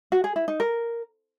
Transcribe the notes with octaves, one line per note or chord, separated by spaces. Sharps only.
F#4
G#4
E4
D#4
A#4